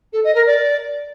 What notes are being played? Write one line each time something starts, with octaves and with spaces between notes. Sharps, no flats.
A4
D#5
A#4
D5